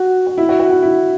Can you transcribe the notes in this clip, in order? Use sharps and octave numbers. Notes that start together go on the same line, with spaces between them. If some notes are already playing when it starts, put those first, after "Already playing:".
Already playing: F#4
F#4
E4
F#4
F#4
E4
E4